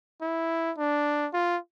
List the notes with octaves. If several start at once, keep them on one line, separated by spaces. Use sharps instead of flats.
E4
D4
F4